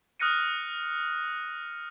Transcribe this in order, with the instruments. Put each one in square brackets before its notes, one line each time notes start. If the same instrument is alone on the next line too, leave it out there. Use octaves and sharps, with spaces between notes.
[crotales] D#6 F6 F#6 A#6 C#7 D#7